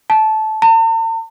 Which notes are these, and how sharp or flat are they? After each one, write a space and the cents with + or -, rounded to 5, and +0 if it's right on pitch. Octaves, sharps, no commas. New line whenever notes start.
A5 -15
A5 +45